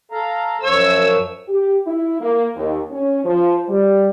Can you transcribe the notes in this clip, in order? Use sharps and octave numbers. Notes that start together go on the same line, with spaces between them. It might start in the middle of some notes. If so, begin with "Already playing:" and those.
A4 F5 A#5
F#2 F3 C#5 E6
G4
E4
A#3
D#2
C#4
F3
G3